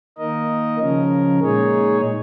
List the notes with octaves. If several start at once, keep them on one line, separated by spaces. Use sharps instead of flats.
D#3 A#3 D#4 A#4 D#5
C#3 F3 C#4 A#4
A#2 G#3 D#4 G#4 C#5